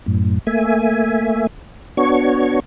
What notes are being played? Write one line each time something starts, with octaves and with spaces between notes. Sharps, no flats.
F#2 A2
A3 A#3 E5 G#5
B3 D4 F#4 C#5 C#6